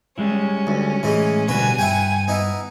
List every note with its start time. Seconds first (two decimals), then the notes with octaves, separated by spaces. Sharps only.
0.18 G3 G#3 C#4 E4
0.67 D2
1.03 A2 E3 G#3
1.48 B2 D3 G3 F#4 B4 G#5
1.79 G2 E4 F#5 G5
2.28 B3 D#4 E4